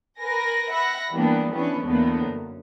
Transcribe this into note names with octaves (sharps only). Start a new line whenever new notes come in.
A#4 B4 G#5 A#6
B4 E5 F#5 B5 A#6
E3 G3 A#3 B3 D4
E3 B3 C#4 D4 B4
E2 A2 D3 A#3 B3
F#2